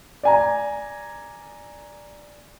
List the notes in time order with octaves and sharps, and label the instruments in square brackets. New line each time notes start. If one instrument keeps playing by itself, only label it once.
[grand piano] D5 G#5 A#5